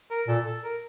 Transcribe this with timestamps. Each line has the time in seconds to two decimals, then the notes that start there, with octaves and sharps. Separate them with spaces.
0.10 A#4
0.28 A#2 A4
0.46 A4
0.63 A#4